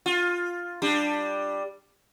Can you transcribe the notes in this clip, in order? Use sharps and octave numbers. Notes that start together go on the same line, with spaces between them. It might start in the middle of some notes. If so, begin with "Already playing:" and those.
F4
G3 D4